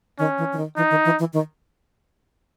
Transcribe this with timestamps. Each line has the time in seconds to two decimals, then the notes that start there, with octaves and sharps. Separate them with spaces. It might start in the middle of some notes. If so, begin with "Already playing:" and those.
0.19 D#3 C#4
0.38 E3
0.53 E3
0.57 D#3
0.77 E3 D#4
0.90 D#3
1.05 E3
1.19 E3
1.33 D#3